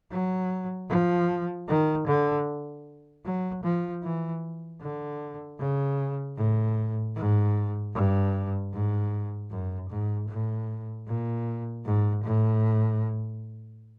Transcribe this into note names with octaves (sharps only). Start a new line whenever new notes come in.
F#3
F3
D#3
D3
F#3
F3
E3
D3
C#3
A2
G#2
G2
G#2
F#2
G#2
A2
A#2
G#2
A2